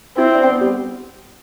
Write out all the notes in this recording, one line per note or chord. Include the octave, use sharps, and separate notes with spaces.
C4 E4
D4
B3
G3